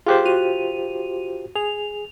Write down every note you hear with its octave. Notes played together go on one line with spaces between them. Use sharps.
F4 G4 G#4 C5 F#6
F#4 D#7 F7
G#4 F7